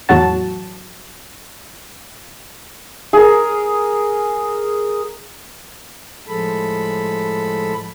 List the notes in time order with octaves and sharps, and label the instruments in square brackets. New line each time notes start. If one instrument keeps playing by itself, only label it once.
[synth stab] E2 A2 F#3 F#4 A5
[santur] G#4 A#4
[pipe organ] A2 F3 G#3 A4 B5